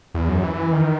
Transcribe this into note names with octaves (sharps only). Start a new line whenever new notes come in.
E2
F#2
E3
D#3